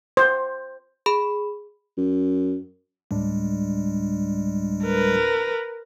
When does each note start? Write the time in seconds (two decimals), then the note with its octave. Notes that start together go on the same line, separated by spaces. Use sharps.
0.17 C5
1.06 G#4 B5
1.97 F#2
3.11 D2 A2 G3 G#3 D4
4.84 A#4 B4